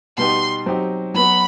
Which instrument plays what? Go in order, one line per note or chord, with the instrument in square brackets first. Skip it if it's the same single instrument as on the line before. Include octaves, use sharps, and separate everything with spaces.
[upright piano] B2 G3 B3 D#4 G4 [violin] C6
[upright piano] F#3 C4 D#4 G4
[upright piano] F#3 B3 F#4 [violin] B5